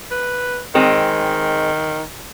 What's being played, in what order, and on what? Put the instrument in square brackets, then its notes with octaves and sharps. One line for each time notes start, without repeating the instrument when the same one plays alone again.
[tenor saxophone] B4
[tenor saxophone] D#3 [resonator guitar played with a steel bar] G#3 C4